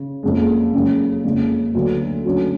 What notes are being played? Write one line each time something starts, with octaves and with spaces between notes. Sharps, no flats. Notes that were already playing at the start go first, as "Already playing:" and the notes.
Already playing: C#3
F#1 F2 C#3 G#3
F#2 C#3 G#3
F#1 F2 C#3 G#3
D2 D3 F#3 B3 F#4
D2 D3 F#3 C#4 F#4